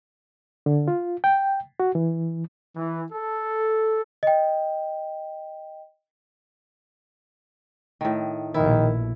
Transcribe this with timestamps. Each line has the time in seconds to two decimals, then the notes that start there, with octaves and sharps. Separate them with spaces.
0.66 D3
0.88 F4
1.24 G5
1.80 F#4
1.95 E3
2.76 E3
3.12 A4
4.23 D#5 G5
8.01 A2 D#3
8.54 A#1 B2 D#3 E4